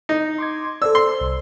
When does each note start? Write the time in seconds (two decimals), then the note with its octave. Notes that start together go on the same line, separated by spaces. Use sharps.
0.09 D#4
0.38 C6 D6 G#6
0.82 A4 C5 D5 E6
0.95 C6
1.21 C2